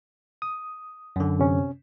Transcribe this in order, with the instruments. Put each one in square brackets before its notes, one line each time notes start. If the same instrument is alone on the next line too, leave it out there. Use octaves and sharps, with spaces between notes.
[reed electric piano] D#6
[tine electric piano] F#2 D3
[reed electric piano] C3 C#4